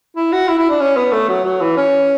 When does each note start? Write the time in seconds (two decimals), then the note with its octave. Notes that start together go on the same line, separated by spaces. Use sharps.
0.16 E4
0.32 F#4
0.48 E4
0.58 E4
0.69 D4
0.80 C#4
0.96 B3
1.12 A3
1.28 F#3
1.45 F#3
1.61 E3
1.77 C#4